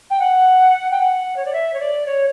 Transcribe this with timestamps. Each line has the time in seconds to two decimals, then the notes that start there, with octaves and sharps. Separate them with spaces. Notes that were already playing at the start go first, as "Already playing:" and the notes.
0.10 G5
0.19 F#5
0.91 G5
0.99 F#5
1.36 C#5
1.44 D5
1.52 E5
1.73 C#5
1.79 D5
2.05 C#5